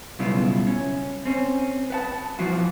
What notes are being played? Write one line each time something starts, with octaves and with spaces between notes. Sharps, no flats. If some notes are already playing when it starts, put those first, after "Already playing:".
B1 C#3 G3 B3 E4 F4
C#4
C4 C#4
B4 F#5 A5
E3 F3 F4 F#4